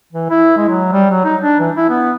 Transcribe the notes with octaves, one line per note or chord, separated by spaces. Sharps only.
E3
E4
G#3
F#3
G3
F#3
D#4
D4
E3
E4
B3